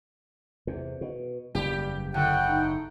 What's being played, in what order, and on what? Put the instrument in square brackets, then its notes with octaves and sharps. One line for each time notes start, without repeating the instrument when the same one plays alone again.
[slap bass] E2 C3
B2
[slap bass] F#1 E2 [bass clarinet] G3 [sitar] G4
[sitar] A2 [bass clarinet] D3 [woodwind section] F#5 G5
[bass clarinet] D#4